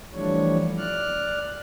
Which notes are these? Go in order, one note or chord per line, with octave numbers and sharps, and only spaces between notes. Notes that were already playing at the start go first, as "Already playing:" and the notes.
E3 F3 G3 A3 D4 C#5
D5 F6 F#6